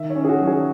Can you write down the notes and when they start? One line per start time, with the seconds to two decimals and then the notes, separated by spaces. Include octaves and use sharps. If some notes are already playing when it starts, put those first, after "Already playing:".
Already playing: D#3 E5
0.10 C#5
0.15 C#4
0.25 G#4
0.29 F#4
0.41 F#3
0.47 G#4